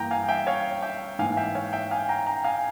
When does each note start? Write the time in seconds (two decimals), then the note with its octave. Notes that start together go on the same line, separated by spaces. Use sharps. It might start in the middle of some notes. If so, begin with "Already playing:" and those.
Already playing: G2 E3 A#3 G5 A#5
0.11 F5 G#5
0.29 E5 G5
0.47 C#5 F5
0.83 E5 G5
1.19 G#2 E3 A#3 F5 G#5
1.37 E5 G5
1.55 C#5 F5
1.73 E5 G5
1.91 F5 G#5
2.09 G5 A#5
2.27 G5 A#5
2.44 F5 G#5